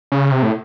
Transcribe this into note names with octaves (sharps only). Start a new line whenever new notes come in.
C#3
C3
A2